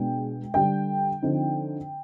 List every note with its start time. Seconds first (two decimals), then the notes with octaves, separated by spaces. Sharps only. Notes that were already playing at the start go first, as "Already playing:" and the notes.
Already playing: B2 G#3 D4 G5
0.54 D3 G3 D4 G5
1.22 D3 F3 C4 D#4